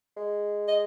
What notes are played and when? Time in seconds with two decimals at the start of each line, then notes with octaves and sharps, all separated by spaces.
0.17 G#3
0.68 D#5